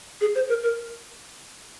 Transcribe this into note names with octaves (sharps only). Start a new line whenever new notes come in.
G#4
C5
A#4
A#4